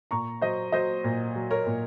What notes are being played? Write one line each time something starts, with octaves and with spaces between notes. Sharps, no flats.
A#2 A#5 C#6
F#3 C5 D#5
F#3 C5 D#5
A#2
F#3
A#4 C#5
A#2